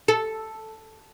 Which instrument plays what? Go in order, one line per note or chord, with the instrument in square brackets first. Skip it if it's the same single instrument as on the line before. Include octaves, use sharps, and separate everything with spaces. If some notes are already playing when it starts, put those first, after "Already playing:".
[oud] A4